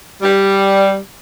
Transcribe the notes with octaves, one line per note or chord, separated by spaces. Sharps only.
G3